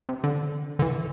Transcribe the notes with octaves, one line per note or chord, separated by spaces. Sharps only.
C3
D3
D3
E3